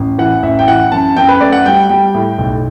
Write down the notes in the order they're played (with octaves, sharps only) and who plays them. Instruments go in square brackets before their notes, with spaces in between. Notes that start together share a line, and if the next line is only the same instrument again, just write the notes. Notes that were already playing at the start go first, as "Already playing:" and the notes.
Already playing: [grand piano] A1
E3 F#5
A1 E5
G5
E3 F#5
F#2 A5
F#2 G5
B4
A3 D5
F#5
G3 G5
G3 G5
A2
B1